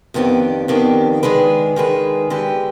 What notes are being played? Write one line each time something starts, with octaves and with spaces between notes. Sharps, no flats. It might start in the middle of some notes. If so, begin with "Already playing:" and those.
F2 D#3 B3 D4 G4
F2 D#3 B3 D4 G4
D#3 G#3 D4 G#4 B4
D#3 G#3 D4 G#4 B4
D3 G#3 D4 G4 B4